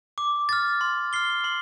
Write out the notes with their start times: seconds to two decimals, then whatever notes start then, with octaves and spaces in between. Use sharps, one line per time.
0.18 D6
0.49 F6 A6
0.81 C6
1.13 F6 C7 G7
1.44 C6